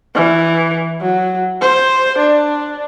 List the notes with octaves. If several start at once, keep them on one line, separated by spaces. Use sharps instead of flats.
E3
F#3
C5
D4